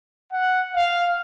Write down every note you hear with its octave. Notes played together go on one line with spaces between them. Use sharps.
F#5
F5